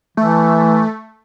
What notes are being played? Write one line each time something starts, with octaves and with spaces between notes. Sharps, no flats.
E3 A3